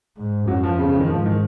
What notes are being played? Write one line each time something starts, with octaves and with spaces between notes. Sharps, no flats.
G#2
F#2 F#3
F3
F2 C#3
C#3
D#3
G#2 F3
D#3